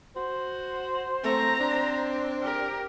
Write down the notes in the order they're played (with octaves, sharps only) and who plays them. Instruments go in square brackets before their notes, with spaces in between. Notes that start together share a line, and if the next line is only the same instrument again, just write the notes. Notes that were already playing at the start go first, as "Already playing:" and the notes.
[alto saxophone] F#4 [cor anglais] C5
[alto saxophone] A3 [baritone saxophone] C4 [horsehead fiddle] A#5
[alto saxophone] D4
[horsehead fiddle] G4 A#4